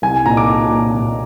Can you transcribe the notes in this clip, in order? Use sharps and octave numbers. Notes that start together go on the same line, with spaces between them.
C2 G#5
A#2 A#5
D6
A#2
A#2
A#2